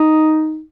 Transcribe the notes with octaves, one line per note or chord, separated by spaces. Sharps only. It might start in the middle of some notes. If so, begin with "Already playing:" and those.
Already playing: D#4